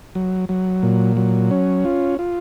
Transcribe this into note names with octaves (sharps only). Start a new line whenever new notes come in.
F#3
F#3
A#2
F#3
C#4
F4
F4